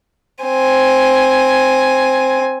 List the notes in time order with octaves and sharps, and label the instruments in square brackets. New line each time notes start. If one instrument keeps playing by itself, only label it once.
[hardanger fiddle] C4 G#5